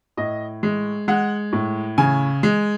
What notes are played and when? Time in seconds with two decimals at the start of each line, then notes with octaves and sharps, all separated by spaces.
0.17 A2 D#5
0.63 G#3
1.08 G#3 F#5
1.53 A2
1.98 C#3 G#5
2.43 G#3